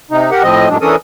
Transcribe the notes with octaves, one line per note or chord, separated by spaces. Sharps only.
C3 D#4
G4 A#4 F#5
A2 F3 C4 D#5
F#2 A2 F#3 G#3 D4
E3 C#4 D4 A4 A#4 D#6